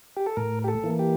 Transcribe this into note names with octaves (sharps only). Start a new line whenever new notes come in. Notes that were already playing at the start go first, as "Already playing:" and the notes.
G4
A4
A2 A#4
G4
A4
E3 A#3
G4